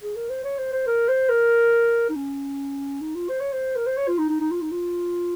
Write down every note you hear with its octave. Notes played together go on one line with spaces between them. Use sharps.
G#4
A#4
C5
C#5
C5
C5
A#4
C5
A#4
D#4
C#4
D#4
F4
C5
C#5
C5
A#4
C5
C#5
F4
D#4
D#4
D#4
F4
D#4
F4